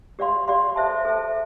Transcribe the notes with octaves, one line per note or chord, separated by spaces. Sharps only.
G4 D5 F5 C6
G4 D5 F5 C6
A4 C5 E5 A5
A4 C5 E5 A5